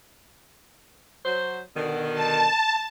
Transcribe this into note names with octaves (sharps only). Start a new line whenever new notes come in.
F#3 C5
B2 D3 D#3
A5